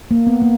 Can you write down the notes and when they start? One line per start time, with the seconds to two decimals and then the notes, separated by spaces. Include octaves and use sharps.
0.11 A#3
0.27 B3
0.42 A#3